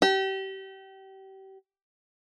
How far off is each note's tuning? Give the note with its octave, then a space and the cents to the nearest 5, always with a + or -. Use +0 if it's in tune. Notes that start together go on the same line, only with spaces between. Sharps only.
G4 -30